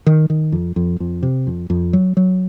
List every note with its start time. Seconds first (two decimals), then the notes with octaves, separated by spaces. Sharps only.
0.06 D#3
0.30 D#3
0.52 F2
0.76 F2
1.00 F2
1.23 C3
1.47 F2
1.70 F2
1.93 F#3
2.17 F#3